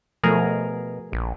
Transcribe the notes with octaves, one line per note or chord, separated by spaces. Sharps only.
B2 F3 A3 G#4 A#4 A#5
A#1